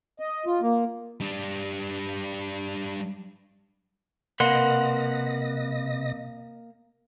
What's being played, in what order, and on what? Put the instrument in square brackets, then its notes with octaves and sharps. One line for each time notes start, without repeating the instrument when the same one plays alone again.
[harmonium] D#5
F4
A#3
[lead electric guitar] G3 D4
[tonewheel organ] C3 D#5 A#6 [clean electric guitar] A#3 [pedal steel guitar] B4 F#5 C6